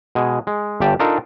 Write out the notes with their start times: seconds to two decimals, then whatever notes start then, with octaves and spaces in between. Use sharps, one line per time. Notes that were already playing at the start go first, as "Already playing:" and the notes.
0.15 B2 G#3 G#5
0.47 G#3
0.80 G1 G2 G4 D5 A5
0.99 D4 D#4 F4 A4 A#4